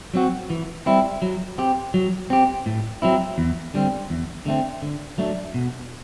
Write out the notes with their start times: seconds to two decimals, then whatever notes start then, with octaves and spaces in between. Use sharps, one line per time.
0.14 F#3 C4 F#4
0.50 E3
0.86 G3 C4 E4
1.22 F#3
1.58 C4 G4
1.94 F#3
2.30 C4 G4
2.66 A2
3.02 F#3 C4 E4
3.38 E2
3.74 D3 G3 C4
4.10 E2
4.46 D3 A3 C4
4.82 D3
5.18 F#3 A3 D4
5.54 B2